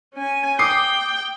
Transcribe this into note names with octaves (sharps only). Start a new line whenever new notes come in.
C#4 G#5
G5 D6 D#6 C7